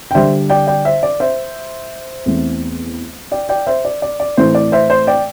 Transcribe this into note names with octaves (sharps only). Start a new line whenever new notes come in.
G5
D3 G3 D4 C5 E5
D5 G5
D5 G5
C5 E5
D5
C5 E5
E2 E3 A3 C4
D5 G5
D5 G5
C5 E5
D5
D5
D5
A2 E3 A3 C4 C5
D5
C5 E5
C5
D5 G5